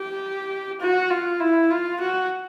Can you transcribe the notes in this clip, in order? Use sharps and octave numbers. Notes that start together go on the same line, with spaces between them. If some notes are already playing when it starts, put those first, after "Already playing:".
Already playing: G4
F#4
F4
E4
F4
F#4